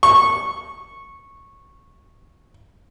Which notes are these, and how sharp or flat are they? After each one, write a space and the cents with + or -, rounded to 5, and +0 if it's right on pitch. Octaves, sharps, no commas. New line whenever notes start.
C#6 -15